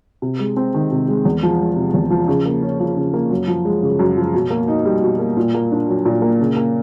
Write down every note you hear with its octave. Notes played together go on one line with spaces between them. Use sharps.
C3
G#3
C4
D#3
C3
G#3
E2
F3
G#3
C3
E2
F3
C#3
A#3
C#4
F3
C#3
A#3
F#2
F3
G#3
C#3
F#2
F3
B2
A#3
D#4
G3
B2
A#3
A#2
A#3
D4
F#3
A#2
A#3
C#3
A#3